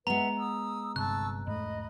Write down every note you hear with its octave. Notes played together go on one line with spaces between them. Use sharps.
G#3 B3 B4 E5 F#5 A#5
D#6 E6
G1 G2 C3 A5 C#6 E6 F#6
E1 G#2 A3 D#5 B5